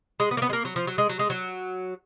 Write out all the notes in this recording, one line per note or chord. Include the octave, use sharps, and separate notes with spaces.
G#3
B3
A#3
B3
G#3
A#3
F#3
F3
F#3
G#3
F#3
G#3
F#3